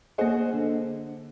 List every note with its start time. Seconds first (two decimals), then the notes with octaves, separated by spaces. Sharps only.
0.18 A#3 G#4 C5 D#5 F#5
0.53 D3 C5